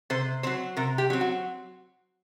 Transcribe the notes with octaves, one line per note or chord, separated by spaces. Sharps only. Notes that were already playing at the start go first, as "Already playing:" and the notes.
C3 C5
F#3 C4 C5
C3 A#4
G4
F#3 C4
F#4